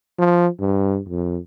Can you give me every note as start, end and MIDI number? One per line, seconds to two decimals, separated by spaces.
0.18 0.48 53
0.60 1.00 43
1.09 1.38 41